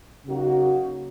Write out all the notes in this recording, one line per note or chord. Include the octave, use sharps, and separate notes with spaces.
C#3 F#3 A#3 D#4 F#4